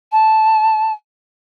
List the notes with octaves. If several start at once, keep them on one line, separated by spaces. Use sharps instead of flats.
A5